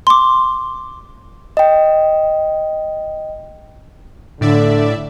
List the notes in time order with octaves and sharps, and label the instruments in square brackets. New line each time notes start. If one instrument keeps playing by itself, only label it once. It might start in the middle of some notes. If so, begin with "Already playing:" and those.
[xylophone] C6 D6
[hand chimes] D#5 G5
[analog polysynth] A2 D5 E5 [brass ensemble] D3